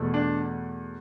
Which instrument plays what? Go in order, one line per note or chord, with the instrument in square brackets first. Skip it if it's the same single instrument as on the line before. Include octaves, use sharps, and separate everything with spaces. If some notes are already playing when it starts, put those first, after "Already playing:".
Already playing: [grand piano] E2 B2 A3
D4